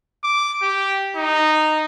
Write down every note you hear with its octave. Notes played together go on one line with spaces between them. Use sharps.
D6
G4
D#4